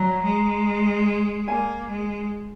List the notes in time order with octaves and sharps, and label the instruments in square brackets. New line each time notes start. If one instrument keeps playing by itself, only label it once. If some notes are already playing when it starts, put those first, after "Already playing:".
Already playing: [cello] F#3 [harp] A#5
[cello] G#3
[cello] A#3 [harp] G#5
[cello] G#3